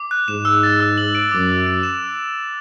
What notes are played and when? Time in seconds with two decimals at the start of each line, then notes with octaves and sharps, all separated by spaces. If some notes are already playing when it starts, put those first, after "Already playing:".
Already playing: D6
0.11 F#6
0.28 G#2 E7
0.45 E6
0.63 A6
0.80 E6
0.98 F#7
1.15 D7
1.31 F#2 D6
1.49 F#7
1.67 D7
1.83 E7